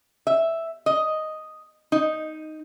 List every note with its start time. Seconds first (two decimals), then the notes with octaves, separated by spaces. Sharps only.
0.27 E5
0.86 D#5
1.92 D#4